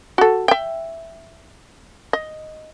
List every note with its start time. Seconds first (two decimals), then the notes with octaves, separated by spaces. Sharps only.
0.18 F#4 A4
0.48 E5 G5
2.13 D#5